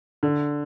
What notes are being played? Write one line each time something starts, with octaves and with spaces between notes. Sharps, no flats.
D3